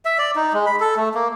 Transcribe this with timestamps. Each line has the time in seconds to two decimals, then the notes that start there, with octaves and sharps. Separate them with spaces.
0.05 E5
0.18 D5
0.36 D#4
0.53 G#3
0.66 B5
0.80 A4
0.97 A3
1.15 A#3